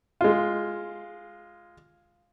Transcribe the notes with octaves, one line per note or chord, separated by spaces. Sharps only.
G#3 F4